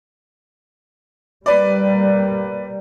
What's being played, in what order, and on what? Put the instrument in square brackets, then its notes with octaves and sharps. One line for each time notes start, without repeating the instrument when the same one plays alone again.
[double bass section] G3 A#3 [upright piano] B4 D5